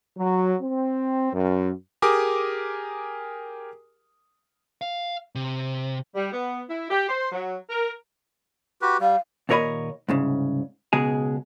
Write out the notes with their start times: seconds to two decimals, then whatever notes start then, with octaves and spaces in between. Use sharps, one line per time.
0.18 F#3
0.61 C4
1.33 F#2
2.02 G4 G#4 A#4 G#5 D6 D#6
4.82 F5
5.35 C3
6.15 G3
6.31 B3
6.69 E4
6.90 G4
7.08 C5
7.31 F#3
7.69 A#4
8.82 F#4 G4 B4
9.00 G3 F5
9.49 D#2 A#2 A#4 C#5 D#5 B5
10.09 C2 G#2 C#3
10.93 C#2 B2 G#3 G#4